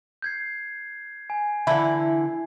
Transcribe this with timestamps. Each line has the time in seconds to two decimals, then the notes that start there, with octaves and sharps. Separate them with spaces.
0.22 G6 G#6 C7
1.30 G#5
1.67 D3 E3 A3 E4